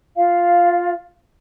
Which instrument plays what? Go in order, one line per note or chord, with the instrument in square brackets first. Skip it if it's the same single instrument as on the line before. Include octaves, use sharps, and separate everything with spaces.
[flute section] F4 F5